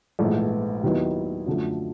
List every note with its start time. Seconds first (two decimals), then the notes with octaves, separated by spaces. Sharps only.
0.19 A#1 G#2 E3 A3
0.83 D#2 D#3 F#3 B3 E4
1.46 F#2 D3 F3 A3